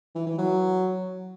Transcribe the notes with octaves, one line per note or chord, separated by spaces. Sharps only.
E3
E3
F#3